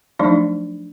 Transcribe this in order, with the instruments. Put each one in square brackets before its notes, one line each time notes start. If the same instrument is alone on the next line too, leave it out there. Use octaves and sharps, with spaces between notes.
[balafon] F3 F#3 A3 D4 D#4